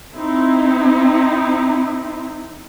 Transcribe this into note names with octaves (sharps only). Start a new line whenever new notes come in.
C4 D#4 E4